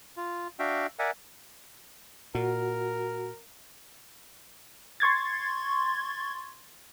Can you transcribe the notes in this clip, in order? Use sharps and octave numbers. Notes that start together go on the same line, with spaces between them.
F4
D4 F#4 E5 F5 G5
A#4 D5 E5 F#5 G#5
A#2 F#4 A#4
C6 C#6 G#6 A6